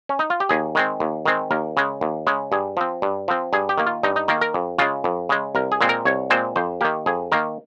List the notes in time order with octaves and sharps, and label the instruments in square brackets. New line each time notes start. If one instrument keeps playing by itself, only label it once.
[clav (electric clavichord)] C#4
D#4
F4
G4
D#2 G#4
D#3 G#3 C4
D#2
D#3 G#3 C4
D#2 A#4
C#3 G#3
D#2
C#3 G#3
G2 G#4
F3 C4
G2
F3 C4
G2 G#4
G4
D#3 A#3
F4
G2 D#4
D#4
D#3 A#3 A#4
A#4
F2
C#3 G#3 F4
F2
C#3 G#3
C2 A#4
G#4
A#2 G#3 C4
A#4
C2 C#5
A#2 G#3 C4 C5
F2 C5
D#3 A#3 G4
F2 G#4
D#3 A#3 A#4